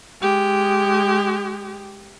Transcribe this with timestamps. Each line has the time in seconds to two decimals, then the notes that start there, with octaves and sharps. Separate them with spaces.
0.21 G#3 G4